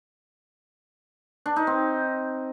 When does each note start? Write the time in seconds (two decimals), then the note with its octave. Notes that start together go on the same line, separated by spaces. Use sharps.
1.46 D4
1.56 D#4
1.67 C4